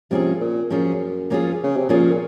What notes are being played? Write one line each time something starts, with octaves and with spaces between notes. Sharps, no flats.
C3 F3 A#3 C#4 F4 G#4
A#2
F#2 F3 A#3 C#4 F4 G#4
F3 A#3 C#4 F4 G#4
C#3
C3
A#2 F3 A#3 C#4 F4 G#4
A#2